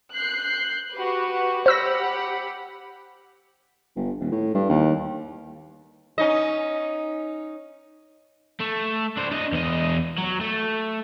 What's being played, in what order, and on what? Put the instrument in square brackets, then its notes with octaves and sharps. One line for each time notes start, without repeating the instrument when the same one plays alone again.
[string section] F#6 G6 C7
F#4 G4 B4
[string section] G4 F#5 B5 [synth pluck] C5 E6 A#6
[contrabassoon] G1
D#1
A2
G2
D#2
[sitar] C#4 D#4 D#5
[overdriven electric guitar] A3
D4 C5
D4 D#5
E2 D#5
F#3
A3